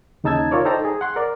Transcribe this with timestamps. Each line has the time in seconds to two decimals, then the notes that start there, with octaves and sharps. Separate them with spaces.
0.24 D#2 C#3 D#4 A5 E6 G#6
0.51 F4 A#4 C#5 D5
0.65 D#4 A4 C5 D5 G5 A#5
0.85 G#4
1.01 F#5 C6
1.16 A#4 D5